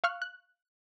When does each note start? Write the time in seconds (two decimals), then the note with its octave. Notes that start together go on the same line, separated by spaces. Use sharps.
0.04 F5 C#6 F6 F#6
0.22 F#6